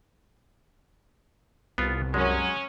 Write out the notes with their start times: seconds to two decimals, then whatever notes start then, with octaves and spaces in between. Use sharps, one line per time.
1.78 C2 B3 F4
2.14 F#2 F#3 G#3 C#4